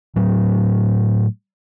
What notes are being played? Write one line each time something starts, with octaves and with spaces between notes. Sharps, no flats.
A2 F#3 A3